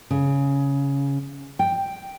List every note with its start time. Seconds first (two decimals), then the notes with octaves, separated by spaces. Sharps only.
0.11 C#3
1.59 G5